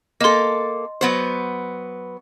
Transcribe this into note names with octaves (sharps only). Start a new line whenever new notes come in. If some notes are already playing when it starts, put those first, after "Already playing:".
A#3 A4 D#5 C6
F#3 B3 C5